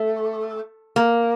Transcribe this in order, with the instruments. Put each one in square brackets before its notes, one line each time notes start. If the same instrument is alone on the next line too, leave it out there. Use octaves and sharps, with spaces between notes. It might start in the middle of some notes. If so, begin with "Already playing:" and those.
Already playing: [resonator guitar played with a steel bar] A3
A#3